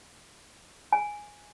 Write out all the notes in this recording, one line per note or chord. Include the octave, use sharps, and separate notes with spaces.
G#5